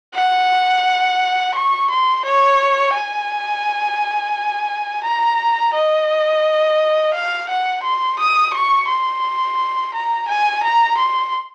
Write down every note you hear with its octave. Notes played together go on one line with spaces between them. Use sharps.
F#5
C#6
C6
C#5
G#5
A#5
D#5
F5
F#5
C6
D#6
C#6
C6
A#5
G#5
A#5
C6